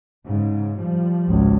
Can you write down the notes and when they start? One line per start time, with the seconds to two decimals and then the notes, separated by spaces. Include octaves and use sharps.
0.24 G#2 C#3
0.76 F3 G3
1.29 G#1 C#2